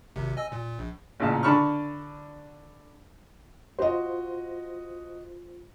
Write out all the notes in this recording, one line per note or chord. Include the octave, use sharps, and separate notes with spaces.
G#1 C3
D#5 G#5 E6
A#2
A#1
A1 A#2 C#3 F5 A5
D3 D4 A5 B5 C#6 F6
F4 F#4 C5 D#5